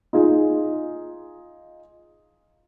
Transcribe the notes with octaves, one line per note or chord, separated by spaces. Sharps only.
D#4 F4 G#4